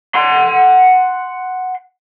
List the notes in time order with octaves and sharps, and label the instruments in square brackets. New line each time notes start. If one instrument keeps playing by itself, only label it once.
[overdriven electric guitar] F#5 C6